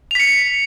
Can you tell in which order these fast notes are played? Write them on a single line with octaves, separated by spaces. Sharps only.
F7 B6 C#7